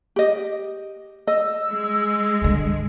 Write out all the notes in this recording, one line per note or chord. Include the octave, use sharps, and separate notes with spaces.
G4 D#5
D#5 E6
G#3
G2 D3